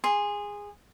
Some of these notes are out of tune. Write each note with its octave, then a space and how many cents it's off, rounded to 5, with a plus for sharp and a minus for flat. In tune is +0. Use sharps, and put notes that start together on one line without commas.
G#4 -15 C6 +0